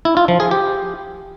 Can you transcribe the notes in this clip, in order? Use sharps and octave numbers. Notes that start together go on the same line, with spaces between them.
E4
F4
F3
G#4
G4